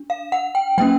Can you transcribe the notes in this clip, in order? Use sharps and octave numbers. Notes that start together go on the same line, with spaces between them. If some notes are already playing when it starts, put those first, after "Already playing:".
Already playing: D4
F5
F#5
G5
F#3 A#3 C#4 G5